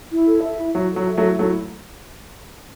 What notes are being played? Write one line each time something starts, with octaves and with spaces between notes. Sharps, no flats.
E4
A4
E5
E4
F#3 E4
A4
F#3
E5
F#3 A3
E4
F#3 A3 E4